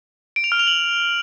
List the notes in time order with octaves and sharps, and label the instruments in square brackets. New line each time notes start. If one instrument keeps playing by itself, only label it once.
[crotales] D7
F7
F6
F7
F#7